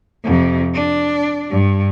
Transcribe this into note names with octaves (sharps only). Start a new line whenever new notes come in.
F2 C3
D4
G2